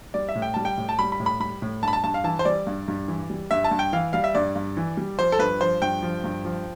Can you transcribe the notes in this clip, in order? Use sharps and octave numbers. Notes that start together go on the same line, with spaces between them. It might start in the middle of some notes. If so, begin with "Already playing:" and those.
G3 D5
E5
A2
G5
G3 A5
G5
A2
A5
G3 B5
B5
A2
B5
G3 B5
A2
G2 A5
B5
A5
G2 A5
F5
E3 A5
C5
G3 D5
G2
G2
E3
G3
G2 E5
A5
G2
G5
E3 F5
G3 F5
E5
G2 D5
G2
E3
G3
F3 C5
A4
G2 B4
F3 C5
G2 G5
F3
G2
F3